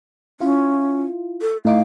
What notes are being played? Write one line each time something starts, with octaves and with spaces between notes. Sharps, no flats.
C#4 E4 F4
A4
A2 D#4 F5 D6